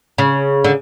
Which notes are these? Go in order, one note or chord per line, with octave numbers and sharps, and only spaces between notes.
C#3
D3